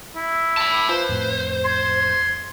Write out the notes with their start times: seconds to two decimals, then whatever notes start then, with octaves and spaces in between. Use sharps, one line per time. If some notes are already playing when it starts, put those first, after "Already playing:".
0.15 E4
0.57 A5 B5
0.89 F4 B4 C5
1.09 F2 A2
1.65 C6 G#6